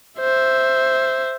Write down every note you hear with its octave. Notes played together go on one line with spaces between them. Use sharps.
C5 E5